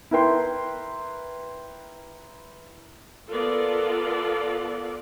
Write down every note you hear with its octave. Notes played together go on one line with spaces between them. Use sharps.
E4 A#4 B4 G5 C6
B3 F4 A4 A#4 D5